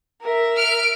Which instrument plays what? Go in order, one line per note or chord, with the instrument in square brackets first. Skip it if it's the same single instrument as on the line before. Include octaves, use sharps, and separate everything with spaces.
[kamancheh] A#4 E5
[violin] F6 D7